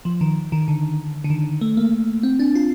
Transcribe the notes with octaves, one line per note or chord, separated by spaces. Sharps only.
F3
D#3
D#3
D3
D3
D#3
A3
A#3
C4
D4
F4